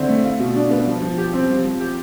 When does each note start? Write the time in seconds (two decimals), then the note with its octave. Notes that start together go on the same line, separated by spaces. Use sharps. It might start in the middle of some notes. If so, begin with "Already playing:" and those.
Already playing: D3 C4 E4
0.09 A3
0.24 F4
0.40 B2
0.55 D4
0.71 B3
0.86 F3
1.02 F3
1.17 G4
1.33 C4
1.49 F3
1.64 F3
1.80 G4